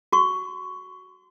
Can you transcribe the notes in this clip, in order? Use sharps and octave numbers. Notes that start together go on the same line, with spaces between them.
F#4 C#6